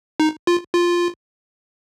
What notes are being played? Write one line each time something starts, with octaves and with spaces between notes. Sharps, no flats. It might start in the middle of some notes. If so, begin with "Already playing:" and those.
D#4
F4
F4